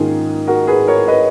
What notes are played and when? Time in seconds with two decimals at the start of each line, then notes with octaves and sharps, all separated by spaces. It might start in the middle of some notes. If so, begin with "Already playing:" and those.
Already playing: G#2 D#3 A#3 C#4 F4 G#4
0.47 F#4 A#4
0.67 G#4 B4
0.87 A#4 C#5
1.08 B4 D#5